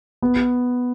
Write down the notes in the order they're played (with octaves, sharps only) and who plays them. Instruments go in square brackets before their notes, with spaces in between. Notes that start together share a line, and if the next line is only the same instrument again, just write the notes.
[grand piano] B3